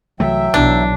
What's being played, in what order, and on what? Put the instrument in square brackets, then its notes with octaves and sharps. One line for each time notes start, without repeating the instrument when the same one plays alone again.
[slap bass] C2 E3 A3 [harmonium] F#3 E5 G5
[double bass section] B1 [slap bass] B2 E3 [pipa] D4